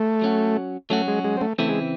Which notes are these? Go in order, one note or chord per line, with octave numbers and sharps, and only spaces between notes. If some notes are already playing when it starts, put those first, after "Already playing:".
Already playing: A3
F#3 C#4 F#4
F#3 A3 C#4 F#4
G#3
G#3
C4
A3
C#3 E3 A3 C4 E4
G#3